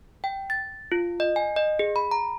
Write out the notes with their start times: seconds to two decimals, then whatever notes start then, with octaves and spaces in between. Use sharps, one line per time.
0.24 G5
0.50 A6
0.92 F4
1.20 D#5
1.36 G#5
1.56 D#5
1.79 G#4
1.96 B5
2.11 A#5